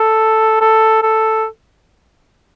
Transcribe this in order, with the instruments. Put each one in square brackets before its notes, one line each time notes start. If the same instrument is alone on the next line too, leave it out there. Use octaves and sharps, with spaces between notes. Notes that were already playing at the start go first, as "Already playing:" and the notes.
Already playing: [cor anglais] A4
A4
A4